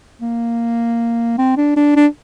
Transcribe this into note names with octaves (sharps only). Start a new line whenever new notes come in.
A#3
C4
D4
D4
D4